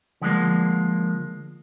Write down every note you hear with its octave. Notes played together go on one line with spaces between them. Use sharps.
D3 F3 G#3 A#3